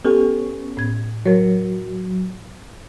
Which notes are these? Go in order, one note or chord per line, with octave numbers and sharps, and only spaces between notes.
B3 C#4 G4 A4 C#5 G5
A2 G#6
F#3 A#4 C#5